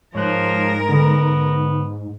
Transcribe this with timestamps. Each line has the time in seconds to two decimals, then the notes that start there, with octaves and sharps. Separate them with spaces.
0.15 G#2 F3 G#3 A#4 C#5 F#6
0.89 D3 B3